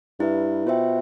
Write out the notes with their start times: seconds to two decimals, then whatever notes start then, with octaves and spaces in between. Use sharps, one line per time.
0.20 G2 E4 B4 E5
0.66 B2 F4 C5 E5 G5